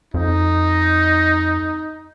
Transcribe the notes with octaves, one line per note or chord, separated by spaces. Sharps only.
F2 D#4